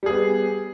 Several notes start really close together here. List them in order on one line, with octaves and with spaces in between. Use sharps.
G3 G#4 B3